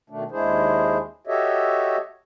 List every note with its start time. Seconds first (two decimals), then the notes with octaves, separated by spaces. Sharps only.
0.10 B2 D#3 A3 D4
0.31 D#2 G#3 D4 E4 G#4 C5
1.27 F#4 G4 A4 C#5 D#5 E5